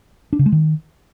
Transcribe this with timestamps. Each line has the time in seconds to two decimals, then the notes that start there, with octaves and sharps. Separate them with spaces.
0.33 D4
0.39 C#3
0.46 G#3
0.52 D#3